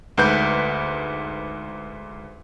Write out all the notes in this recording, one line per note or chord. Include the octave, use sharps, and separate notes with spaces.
D2 G#2 B4 G6